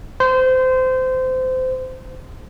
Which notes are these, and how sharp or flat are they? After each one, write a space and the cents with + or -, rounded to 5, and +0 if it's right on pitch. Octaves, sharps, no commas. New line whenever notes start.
C5 -25